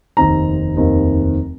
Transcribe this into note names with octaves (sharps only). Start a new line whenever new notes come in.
F1 D#2 D#3 C4 D#4 A#5
F1 D#2 D#3 C4 D#4